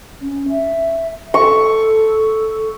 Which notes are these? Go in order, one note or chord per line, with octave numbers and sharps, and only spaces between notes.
C#4
E5
A4 C#6